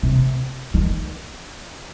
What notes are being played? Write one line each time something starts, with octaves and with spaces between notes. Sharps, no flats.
C3
D#3